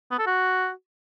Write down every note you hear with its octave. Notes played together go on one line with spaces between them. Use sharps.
B3
A4
F#4